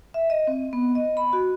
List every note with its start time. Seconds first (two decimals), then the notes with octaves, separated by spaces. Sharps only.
0.14 E5
0.30 D#5
0.47 C4
0.73 B3
0.95 D#5
1.17 B5
1.33 F#4